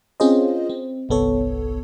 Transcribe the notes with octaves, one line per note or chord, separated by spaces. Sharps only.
C4 C#4 F4 G#4 C5 D#5
C4
G1 C2 B3 A4 C#5